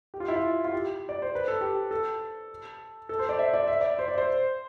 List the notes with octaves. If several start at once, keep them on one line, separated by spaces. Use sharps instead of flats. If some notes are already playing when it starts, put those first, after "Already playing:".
G4
F4
E4
F4
F4
G4
D5
C5
B4
A4
G4
A4
A4
C5
D5
E5
D5
E5
D5
C5
D5
C5